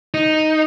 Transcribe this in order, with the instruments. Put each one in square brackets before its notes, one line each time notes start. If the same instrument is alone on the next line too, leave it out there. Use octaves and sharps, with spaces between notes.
[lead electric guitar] D#4